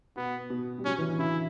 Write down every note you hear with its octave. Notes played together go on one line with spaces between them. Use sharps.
B2 B3
B2
G3
F#3 C#4
E3
D3
C#3 E4